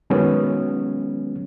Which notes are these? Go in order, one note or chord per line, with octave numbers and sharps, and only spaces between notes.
D#3 F#3 G#3 B3 C#4